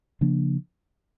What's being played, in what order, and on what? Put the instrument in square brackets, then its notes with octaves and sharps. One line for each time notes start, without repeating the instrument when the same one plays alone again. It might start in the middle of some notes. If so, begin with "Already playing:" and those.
[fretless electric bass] C#3 F3 A#3 D4